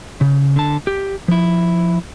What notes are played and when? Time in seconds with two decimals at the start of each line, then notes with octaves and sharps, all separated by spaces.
0.21 C#3
0.56 D3 A5
0.87 G4
1.28 F3 E4